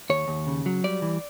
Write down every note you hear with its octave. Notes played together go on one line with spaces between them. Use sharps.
D#2 C#5
D#2
C#3
F#3
G3 D5
E3